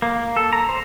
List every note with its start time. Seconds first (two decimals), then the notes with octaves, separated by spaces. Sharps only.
0.02 A#3
0.37 A4
0.53 A#5
0.69 C5